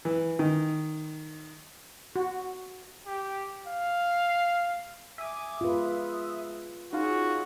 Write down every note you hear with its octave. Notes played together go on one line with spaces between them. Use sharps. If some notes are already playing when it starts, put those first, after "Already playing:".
E3
D#3
F#4
G4
F5
E5 G#5 D6 D#6
G#3 F4 B4
C#4 D#4 F4 F#4 G#4